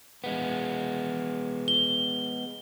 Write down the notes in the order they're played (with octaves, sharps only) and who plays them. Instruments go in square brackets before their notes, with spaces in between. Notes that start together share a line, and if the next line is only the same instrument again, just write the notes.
[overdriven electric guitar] G#3 B3
[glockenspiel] G7